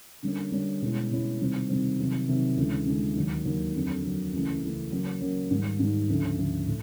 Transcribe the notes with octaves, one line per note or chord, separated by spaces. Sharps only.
D3 G3 A#3 C#4
D3 G3 A#3 C#4
B2 G#3 C#4 E4
B2 G#3 C#4 E4
C3 D#3 G3 C4
C3 D#3 G3 C4
C3 D#3 F#3
C3 D#3 F#3
D2 C#3 E3 G#3
D2 C#3 E3 G#3
D#2 D#3 F#3
D#2 D#3 F#3
F2 D3 F#3
F2 D3 F#3
C#2 C#3 E3 A3
C#2 C#3 E3 A3
C#3 F#3 A#3 C#4
C#3 F#3 A#3 C#4
G#2 D#3 G3
G#2 D#3 G3
D2 C#3 F3
D2 C#3 F3
A2